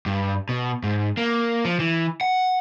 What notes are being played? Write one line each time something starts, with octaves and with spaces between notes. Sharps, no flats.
G2
B2
G#2
A#3
F3
E3
F#5